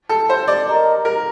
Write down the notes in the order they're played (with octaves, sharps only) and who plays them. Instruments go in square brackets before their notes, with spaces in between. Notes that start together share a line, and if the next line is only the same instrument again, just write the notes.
[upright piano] A4
C5
D5
[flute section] G4 A#4 D#5 A#5
[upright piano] A#4